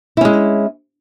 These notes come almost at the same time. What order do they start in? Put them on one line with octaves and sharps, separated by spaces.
E4 C#4 G#3